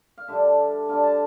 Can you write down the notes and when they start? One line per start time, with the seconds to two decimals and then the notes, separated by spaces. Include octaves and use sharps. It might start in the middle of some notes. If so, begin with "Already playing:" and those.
0.18 F5
0.28 D3 G3 D4 E5
0.89 D3 G3 D4 F5
1.04 A5